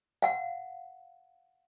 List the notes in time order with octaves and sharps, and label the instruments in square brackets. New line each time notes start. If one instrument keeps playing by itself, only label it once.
[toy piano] F5 F#5